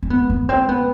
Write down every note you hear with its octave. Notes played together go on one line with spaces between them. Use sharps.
C4
B3
B3
C4
B3